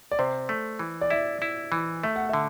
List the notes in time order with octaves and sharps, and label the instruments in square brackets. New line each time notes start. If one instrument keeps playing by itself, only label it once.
[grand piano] D5
[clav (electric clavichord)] C3 [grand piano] C5
[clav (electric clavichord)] A3
E3
[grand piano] D5
[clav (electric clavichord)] E4 [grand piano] E5
[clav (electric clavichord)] E4
E3
[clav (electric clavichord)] A3 [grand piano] E5
[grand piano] F#5
[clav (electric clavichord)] D3 [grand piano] E5